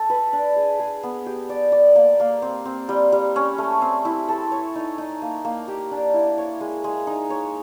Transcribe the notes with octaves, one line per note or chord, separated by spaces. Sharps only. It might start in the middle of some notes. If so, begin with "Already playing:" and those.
Already playing: A4
B4
D4
G#4
G#4
B3
G4
D5
D5
A#3
A#3
C4
C4
G3
G3
C#4
A3
C4
E4
A4
C#5
D#4
D#4
A#3
A#3
G4
D4
E4
C#5
G#3
G#3
D#4
C#5